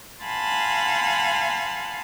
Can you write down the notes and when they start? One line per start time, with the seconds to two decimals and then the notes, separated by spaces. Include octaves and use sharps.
0.24 F5 F#5 G#5 A5 B5 C6